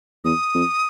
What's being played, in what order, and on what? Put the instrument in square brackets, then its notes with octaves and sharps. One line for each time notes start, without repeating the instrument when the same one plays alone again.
[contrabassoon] E2 [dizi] D#6
[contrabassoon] F2